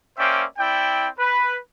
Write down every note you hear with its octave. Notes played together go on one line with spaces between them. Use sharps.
A#3 C#4 C5 D5 E5 G5
C4 E4 D5 G5
B4